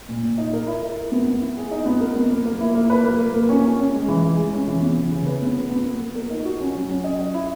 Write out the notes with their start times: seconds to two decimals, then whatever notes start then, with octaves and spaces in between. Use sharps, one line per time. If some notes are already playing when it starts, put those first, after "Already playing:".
0.09 A#2
0.23 A#2
0.38 D#4
0.53 A#4
0.67 E4
0.82 A#4
0.97 A#4
1.12 B3
1.27 B3
1.42 E4
1.57 G#4
1.71 D#4
1.86 B3
2.01 A#4
2.16 B3
2.30 A#3
2.46 A#3
2.60 E4
2.75 A#3
2.90 B4
3.04 A#3
3.19 A#3
3.34 A#3
3.49 C#4
3.64 C#4
3.79 C#4
3.94 G#3
4.08 E3
4.23 G#3
4.37 G#3
4.53 C#4
4.67 E3
4.82 B3
4.97 E3
5.12 C#3
5.27 B4
5.42 B3
5.56 B4
5.71 B3
5.86 A#3
6.00 A#3
6.15 A#4
6.30 D#4
6.45 F#4
6.60 C#4
6.75 F#3
6.89 C#4
7.04 D#5
7.19 D#5
7.34 E4